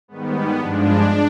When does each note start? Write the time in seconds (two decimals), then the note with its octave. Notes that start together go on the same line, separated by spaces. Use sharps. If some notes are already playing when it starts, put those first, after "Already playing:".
0.08 G#2 D#3 G3 B3
0.58 G2 F3 G#3 D4